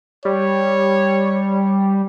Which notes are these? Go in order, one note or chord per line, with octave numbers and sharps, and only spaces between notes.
G3 C#5